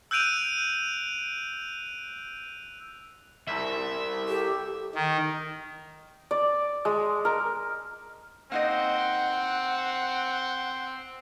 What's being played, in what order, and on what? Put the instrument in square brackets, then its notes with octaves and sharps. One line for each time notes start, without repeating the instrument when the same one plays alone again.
[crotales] E6 F#6 G6 D7 D#7 F7
[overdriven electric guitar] C2 [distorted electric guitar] E5
[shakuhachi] G4 [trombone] A4
[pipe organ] D#3
[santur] D5
G#3
A#4
[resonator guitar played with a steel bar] A#3 D#4 D#5 [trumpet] C4 [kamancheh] F#5